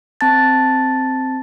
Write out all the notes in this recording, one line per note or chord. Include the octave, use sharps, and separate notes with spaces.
C4 A5 A6